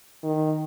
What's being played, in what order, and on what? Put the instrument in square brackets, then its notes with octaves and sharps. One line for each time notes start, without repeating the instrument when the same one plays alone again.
[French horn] D#3